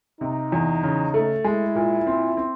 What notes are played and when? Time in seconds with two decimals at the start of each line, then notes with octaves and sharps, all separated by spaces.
0.21 C3 D#4
0.52 E2
0.83 C#3
1.14 A3
1.44 G#3 E4
1.75 A#2
2.07 C4
2.37 C4